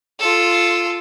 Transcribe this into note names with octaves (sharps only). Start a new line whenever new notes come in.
F4 A4